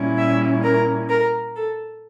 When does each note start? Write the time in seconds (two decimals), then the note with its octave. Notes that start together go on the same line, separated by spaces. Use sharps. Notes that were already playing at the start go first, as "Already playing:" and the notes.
Already playing: A#2 G3 C#4 E4
0.18 E5
0.64 A#4
1.09 A#4
1.56 A4